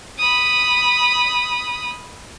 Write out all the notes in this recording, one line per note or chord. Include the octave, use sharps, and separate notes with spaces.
B5 D#6